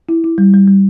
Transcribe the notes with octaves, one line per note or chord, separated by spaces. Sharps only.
E4
E4
G3
G3
G3